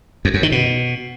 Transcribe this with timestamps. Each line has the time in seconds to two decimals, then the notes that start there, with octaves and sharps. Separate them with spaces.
0.25 F2
0.34 F#2
0.43 D#3
0.52 B2